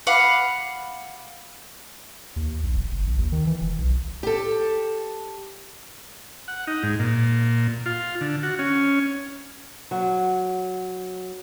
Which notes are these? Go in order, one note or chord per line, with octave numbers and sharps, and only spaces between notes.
F5 F#5 B5 D6
D#2
A#1
D#1
G1
A#1
D#2
D#3
E3
E1
B1
G4 A4
F#5
D#4
G#2
A#2
F4
D3
F#4
C#4
F#3